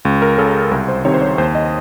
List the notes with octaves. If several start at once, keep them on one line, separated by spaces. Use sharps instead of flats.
C#2
A#4
C#3 A4
C2 A#4
C5
C3 D#3 C#5
C5
C#5
D#2 C5
D#5